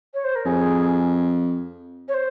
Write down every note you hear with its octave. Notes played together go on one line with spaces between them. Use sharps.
C#5
C5
A#4
F2 G#4
C#5
C5